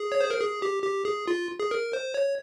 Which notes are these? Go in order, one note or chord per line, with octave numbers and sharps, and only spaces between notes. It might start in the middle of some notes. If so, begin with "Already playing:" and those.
Already playing: G#4
C#5
C5
A#4
G#4
G4
G4
G#4
F4
G#4
A#4
C5
C#5